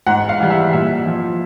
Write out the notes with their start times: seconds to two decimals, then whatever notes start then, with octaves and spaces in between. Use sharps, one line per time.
0.07 G#2 F#5
0.29 F5
0.40 E3 G3
0.50 E5
0.73 A#2 E5
1.06 F3